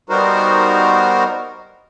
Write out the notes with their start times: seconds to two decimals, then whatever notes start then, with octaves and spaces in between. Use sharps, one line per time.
0.09 G3 B3 D#4 F#4 A#4 C5